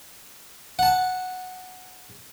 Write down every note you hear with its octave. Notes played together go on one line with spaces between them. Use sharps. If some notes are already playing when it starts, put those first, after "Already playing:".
F#5 A5